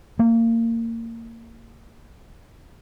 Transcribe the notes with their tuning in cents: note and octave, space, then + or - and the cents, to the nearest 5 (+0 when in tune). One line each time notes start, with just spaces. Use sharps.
A#3 -30